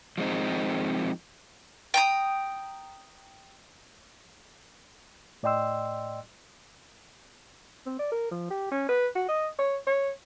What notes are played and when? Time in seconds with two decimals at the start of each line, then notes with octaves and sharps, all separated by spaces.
0.18 F3 G#3 C4 D#4
1.94 G5 A#5 D#6
5.43 A2 D5 D#5 G5 C6 E6
7.86 C4
7.99 D5
8.12 A#4
8.31 F3
8.50 G4
8.71 C#4
8.89 B4
9.15 F#4
9.28 D#5
9.59 C#5
9.87 C#5